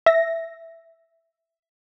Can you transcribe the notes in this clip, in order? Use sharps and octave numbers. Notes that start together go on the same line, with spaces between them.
E5 A#6